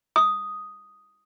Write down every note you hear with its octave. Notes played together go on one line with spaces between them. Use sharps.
D#6